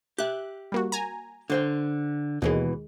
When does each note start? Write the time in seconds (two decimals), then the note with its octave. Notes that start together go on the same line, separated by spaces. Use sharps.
0.18 G4 E5 F#6
0.72 G3 A#3 F#4
0.92 G#5 A#5
1.50 D3 C5 G5
2.42 D#2 B2 E3 G#3